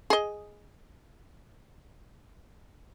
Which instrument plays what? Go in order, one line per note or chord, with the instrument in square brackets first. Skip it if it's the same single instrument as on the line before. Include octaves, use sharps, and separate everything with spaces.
[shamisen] G#4 D#5